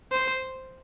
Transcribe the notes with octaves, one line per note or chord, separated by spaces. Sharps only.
C5